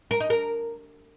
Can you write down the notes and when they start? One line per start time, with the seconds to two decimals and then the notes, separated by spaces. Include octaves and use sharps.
0.11 A#4
0.20 D#4
0.30 A#4